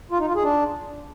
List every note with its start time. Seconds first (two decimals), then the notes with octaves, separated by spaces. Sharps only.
0.11 F4
0.19 D#4
0.27 F4
0.35 G#4
0.43 D4